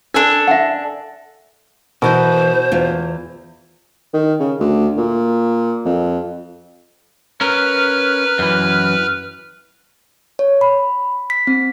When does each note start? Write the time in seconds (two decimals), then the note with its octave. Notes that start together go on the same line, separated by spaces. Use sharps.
0.14 D4 A4 A#4 G#5
0.48 E5 F#5
2.02 B2 E3 A#4 C5
2.72 E2 F4
4.14 D#3
4.40 C#3
4.59 D2
4.97 A#2
5.85 F2
7.41 C#4 A#4 B4 F6
8.39 F#2 E3
10.39 C#5
10.61 B5
11.30 B6
11.47 C4